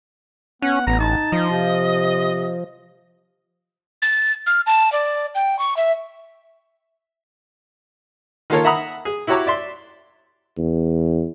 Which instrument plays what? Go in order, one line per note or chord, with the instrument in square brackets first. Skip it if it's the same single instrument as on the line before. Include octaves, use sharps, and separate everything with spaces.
[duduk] B3 [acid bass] C#4 [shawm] F#5
[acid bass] A1 [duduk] B3 [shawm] A#5
[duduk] D#4 [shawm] A5
[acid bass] F3 [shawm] D#5
[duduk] C3
[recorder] A6
F6
A5
D5
G5
C#6
E5
[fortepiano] D#3 A#3 F4 A4 A#4 C#5
E5 F#5 A#5 B5 D#6
G#4
E4 F#4 G4 C#5 A#5 D6
D5 E5 C6
[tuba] E2